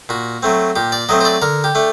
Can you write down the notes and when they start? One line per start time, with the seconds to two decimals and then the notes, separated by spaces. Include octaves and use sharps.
0.09 A#2 F#4
0.43 F#3 A3 C4
0.76 A#2 G4
0.92 D5
1.09 F#3 A3 C4 D#5
1.21 C5
1.25 D5
1.42 D3 A#4
1.64 G4
1.75 A3 D4